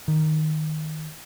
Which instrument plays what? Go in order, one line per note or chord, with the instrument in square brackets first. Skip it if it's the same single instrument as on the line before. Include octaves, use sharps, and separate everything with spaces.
[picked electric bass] D#3